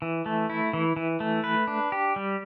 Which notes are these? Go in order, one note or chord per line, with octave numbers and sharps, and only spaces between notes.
E3
A3
E4
E3
E3
A3
B4
D4
G4
G3